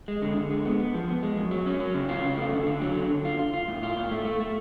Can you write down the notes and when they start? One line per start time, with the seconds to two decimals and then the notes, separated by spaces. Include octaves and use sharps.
0.08 G#3
0.22 D3
0.37 D3
0.51 G#3
0.65 B3
0.79 B3
0.94 F3
1.08 B3
1.23 G#3
1.38 F#2
1.51 F#3
1.66 C#4
1.80 F#3
1.94 C#3
2.09 F4
2.24 C#3
2.38 A3
2.53 D3
2.67 D3
2.82 F#3
2.95 D3
3.10 D3
3.25 F4
3.39 F4
3.54 F4
3.68 A2
3.83 F4
3.97 A2
4.11 A3
4.25 A3
4.40 A3